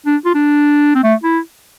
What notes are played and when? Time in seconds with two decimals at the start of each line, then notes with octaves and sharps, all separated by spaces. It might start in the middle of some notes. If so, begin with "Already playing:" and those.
0.06 D4
0.25 F4
0.34 D4
0.95 C4
1.04 A3
1.23 E4